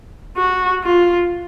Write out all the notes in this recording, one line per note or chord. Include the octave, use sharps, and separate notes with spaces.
F#4
F4